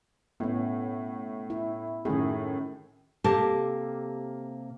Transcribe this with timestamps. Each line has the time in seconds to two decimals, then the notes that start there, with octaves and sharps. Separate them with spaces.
0.40 A2 B3 C#4
1.50 E4
2.05 F#2 A2 D#3 G#4
3.24 C3 A#3 G4 A4 A5